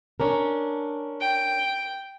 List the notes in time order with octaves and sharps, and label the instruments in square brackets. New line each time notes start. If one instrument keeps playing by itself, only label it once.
[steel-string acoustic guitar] C#4 D4 A#4
[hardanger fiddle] G5